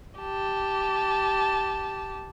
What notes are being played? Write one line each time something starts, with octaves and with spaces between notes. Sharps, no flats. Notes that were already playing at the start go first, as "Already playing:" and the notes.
G4 A5